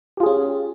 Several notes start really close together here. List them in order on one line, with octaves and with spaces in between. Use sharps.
G4 F4 G#4 C#4